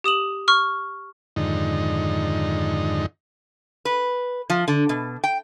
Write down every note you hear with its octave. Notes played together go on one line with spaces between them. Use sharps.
G4 D#6 E7 F#7
C#6 F6
F2 G#2 D3 D#3 D#4
B4
F3
D3
B2
G5